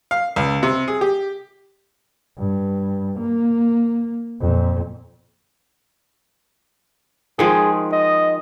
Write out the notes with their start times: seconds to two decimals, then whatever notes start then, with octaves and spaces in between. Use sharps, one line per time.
0.11 F5
0.36 C#2
0.63 C3
0.88 G#4
1.01 G4
2.38 G2
3.20 A#3
4.41 F2 A#2
7.39 D#3 F3 G#3 G#4
7.92 D#5